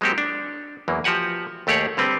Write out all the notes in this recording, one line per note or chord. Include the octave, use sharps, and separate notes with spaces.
F#3 G#3 A#3 C4 F#4 G4
D4
E2 E3 F#3 A#3
F3 F#4 G4 F#5 G#5
D#2 A3 G4 G#4 C#5 F#5
D3 G3 C4 B4 G5